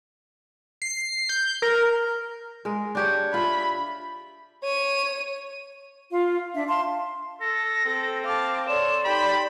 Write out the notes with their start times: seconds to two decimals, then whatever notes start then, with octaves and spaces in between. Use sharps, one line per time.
0.82 C7
1.29 G6
1.62 A#4
2.65 G#3 A#4
2.95 D4 G4 C#5
3.34 F4 E5 B5
4.64 C#5 D#7
6.11 F4 F5
6.54 D4 E5
6.68 F5 A5 C6
7.41 A4 A#6
7.85 C4 A4
8.25 F5 A5 D6
8.67 A4 C#5 D5 C6 E7
9.05 D#4 G4 G5 B5